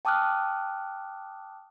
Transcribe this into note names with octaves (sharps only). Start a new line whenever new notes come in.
G5 A5 D6 D#6 F6 F#6